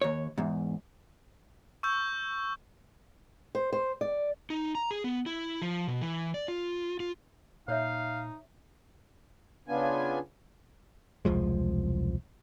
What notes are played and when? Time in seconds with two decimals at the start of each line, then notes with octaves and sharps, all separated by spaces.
0.02 D#2 C#5
0.38 E2 G#2
1.83 C#6 E6 G6
3.55 C5
3.73 C5
4.01 D5
4.50 D#4
4.75 A#5
4.91 G#4
5.04 B3
5.26 E4
5.62 F3
5.87 B2
6.02 E3
6.34 D5
6.48 F4
7.00 F4
7.68 A#2 D#4 C5 C#5 E5 F5
9.68 C#3 B3 D4 F4 G#5
11.25 E1 C2 F3 G#3